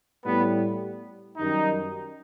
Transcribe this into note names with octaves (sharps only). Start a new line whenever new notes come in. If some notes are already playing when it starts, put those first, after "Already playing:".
A2 G3 B3
F#2 D#3 G3 D#4